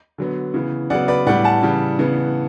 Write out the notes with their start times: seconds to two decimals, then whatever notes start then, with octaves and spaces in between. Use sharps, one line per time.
0.18 D3 F#3 B3
0.54 C#3 E3 B3
0.90 C#3 F#3 B3 D5 F#5
1.08 B4 D5
1.26 A2 G3 B3 D5 F#5
1.44 F#5 A5
1.63 C#3 E3 G3
1.99 C#3 E3 B3